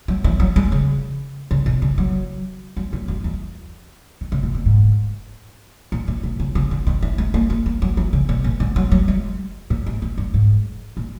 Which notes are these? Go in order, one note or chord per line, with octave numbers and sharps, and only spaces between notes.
F#3
E3
F#3
G#3
C#3
C#3
B2
C#3
F#3
F#3
A#2
F#2
E2
D#3
C#3
B2
A#2
G#2
A#2
A#2
B2
C#3
C#3
C#3
D#3
E3
G#3
A#3
A#3
A#3
F#3
E3
C#3
B2
A#2
G#2
F#3
F#3
G#3
A#2
G#2
G#2
F#2
G#2
A#2